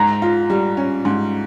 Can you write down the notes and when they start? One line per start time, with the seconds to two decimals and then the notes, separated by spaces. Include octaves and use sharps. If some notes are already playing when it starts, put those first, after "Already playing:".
Already playing: G#2 A#5
0.22 F4
0.50 G3
0.77 C#4
1.05 G#2